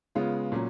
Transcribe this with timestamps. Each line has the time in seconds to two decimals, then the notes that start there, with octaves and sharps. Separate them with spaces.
0.15 C#3 G#3 B3 F4
0.52 A#2 F#3 C#4